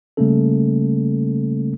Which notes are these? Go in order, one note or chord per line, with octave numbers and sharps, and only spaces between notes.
C#3 G3 A3 A#3 C#4 A4